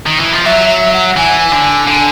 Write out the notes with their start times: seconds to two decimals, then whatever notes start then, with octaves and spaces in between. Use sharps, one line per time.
0.06 D#3
0.20 E3
0.33 F3
0.46 F#3 E5
0.69 E5
0.93 F#5
1.17 E3 G#5
1.52 D3
1.87 D3